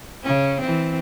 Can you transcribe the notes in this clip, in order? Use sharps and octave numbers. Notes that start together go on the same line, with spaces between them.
C#3 C#4
E3 C4